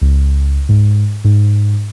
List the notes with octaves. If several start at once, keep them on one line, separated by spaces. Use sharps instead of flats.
C#2
G#2
G#2